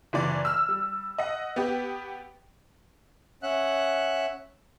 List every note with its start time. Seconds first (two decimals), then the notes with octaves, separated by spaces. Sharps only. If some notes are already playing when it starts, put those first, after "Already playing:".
0.13 F#1 E3 D5
0.45 E6 F6
0.69 G3
1.18 D#5 F#5
1.56 B3 G4
3.43 C#4 E5 F#5 F#6